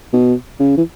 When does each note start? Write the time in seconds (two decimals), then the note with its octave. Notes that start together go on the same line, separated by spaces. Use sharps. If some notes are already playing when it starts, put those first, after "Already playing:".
0.13 B2
0.60 C#3
0.77 E3